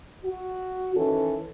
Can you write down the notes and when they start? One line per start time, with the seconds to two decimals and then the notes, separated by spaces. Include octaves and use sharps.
0.24 F#4
0.95 D#3 E3 C#4 A4